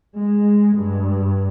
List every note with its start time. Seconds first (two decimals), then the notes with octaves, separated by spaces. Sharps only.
0.16 G#3
0.77 G2